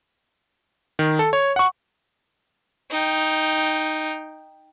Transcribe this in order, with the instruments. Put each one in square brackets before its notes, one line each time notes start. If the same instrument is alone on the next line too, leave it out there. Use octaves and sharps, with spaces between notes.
[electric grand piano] D#3
A4
C#5
F#5 C#6
[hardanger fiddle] D#4 G5